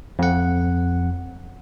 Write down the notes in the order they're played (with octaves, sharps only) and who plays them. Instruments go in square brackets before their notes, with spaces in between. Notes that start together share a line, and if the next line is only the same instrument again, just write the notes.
[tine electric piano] F2 F#5